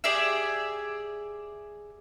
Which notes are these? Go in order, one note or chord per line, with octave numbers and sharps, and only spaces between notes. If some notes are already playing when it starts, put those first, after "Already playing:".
G4 G#4 D5 E5